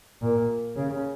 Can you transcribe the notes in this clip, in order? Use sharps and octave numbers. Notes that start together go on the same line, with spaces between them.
A#2
C#3